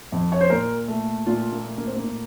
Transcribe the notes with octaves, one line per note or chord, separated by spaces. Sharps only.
F2
C#5
C5
A#2 A#4
A3
A#2 F4
A#3
A3
A#3
C4
A#3
A#2